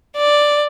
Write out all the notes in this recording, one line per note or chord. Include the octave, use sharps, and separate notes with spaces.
D5